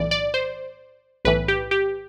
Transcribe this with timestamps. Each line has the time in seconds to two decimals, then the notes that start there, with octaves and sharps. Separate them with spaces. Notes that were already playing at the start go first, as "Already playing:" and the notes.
Already playing: B1 A2 E3 D5
0.11 D5
0.34 C5
1.25 B1 A2 E3 B4
1.48 G4
1.71 G4